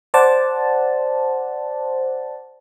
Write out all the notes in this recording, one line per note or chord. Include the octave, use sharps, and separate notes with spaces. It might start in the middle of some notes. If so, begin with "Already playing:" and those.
C5 D5 F#5 A5